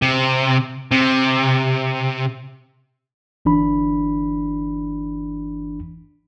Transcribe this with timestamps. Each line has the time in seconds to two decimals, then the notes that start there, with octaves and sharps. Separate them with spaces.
0.02 C3
0.91 C3
3.45 G1 E3 D4 B5